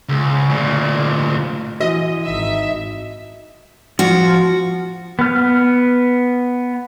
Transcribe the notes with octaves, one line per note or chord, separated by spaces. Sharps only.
C#2
D2 A#2
E3 F#4 D#5
G#1 D#4 E5
F3 F#4
B3 F6